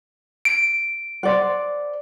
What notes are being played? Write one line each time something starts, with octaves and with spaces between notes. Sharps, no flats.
D7
C5 D5 F#5